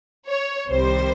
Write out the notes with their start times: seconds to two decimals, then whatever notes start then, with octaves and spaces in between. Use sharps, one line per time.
0.28 C#5
0.69 C2 C3 D#3 G3 C5